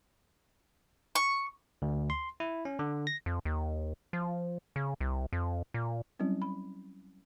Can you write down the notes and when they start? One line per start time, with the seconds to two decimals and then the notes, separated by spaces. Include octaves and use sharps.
1.15 C#6
1.82 D2
2.10 C6
2.40 E4
2.65 C#4
2.79 D3
3.07 A#6
3.26 F2
3.45 D#2
4.13 F3
4.76 C#3
5.01 C2
5.33 F2
5.74 A#2
6.19 F#3 G3 C4 C#4 E4
6.42 B5